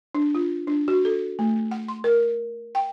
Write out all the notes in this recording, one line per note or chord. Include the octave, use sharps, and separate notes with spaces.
D4
F4
D4
F#4
A4
A3
F#5
C6
A#4
G5